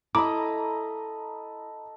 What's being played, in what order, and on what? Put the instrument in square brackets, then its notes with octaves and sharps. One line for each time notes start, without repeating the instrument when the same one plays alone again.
[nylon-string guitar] E4 [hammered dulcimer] A4 D#5 [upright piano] A#5 B5 [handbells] D6